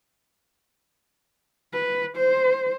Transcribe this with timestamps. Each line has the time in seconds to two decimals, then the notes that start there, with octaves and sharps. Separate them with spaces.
1.73 B4
2.17 C5